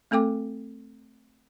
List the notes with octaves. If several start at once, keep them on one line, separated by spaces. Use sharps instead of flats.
A3 C4 A4 G5 D6